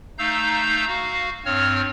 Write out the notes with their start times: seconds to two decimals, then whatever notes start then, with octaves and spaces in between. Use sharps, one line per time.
0.18 A3 D#4 F5 A#5 E6 G6
0.87 F#4 F5
1.46 G2 C4 C#5 F6